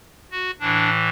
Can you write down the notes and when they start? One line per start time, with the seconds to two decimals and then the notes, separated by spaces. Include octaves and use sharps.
0.31 F#4
0.60 A2 E3 D4